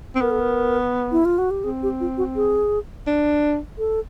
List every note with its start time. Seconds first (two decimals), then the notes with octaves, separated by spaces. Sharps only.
0.15 C4
0.21 B3 A#4
0.31 A4
0.40 A#4
1.12 E4
1.25 F4
1.38 F#4
1.51 G4
1.64 C4 G#4
1.83 G4
2.00 F4
2.17 F#4
2.36 G#4
3.07 D4
3.78 A4